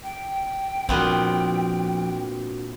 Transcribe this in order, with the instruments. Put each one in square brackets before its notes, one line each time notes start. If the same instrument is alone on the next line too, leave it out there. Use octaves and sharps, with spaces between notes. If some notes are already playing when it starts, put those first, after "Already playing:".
[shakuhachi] G5
[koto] A#2 B3 C4 [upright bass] F3 [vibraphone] D4 F#4